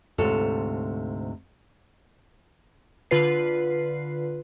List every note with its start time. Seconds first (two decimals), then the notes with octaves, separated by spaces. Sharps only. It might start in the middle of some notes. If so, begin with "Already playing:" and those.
0.18 D2 G#2 C3 F4 A4 C#5
3.11 D3 F4 B4 C7